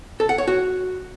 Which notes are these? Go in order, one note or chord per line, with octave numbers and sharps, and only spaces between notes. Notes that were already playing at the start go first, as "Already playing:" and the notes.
A4
F#5
C#5
F#4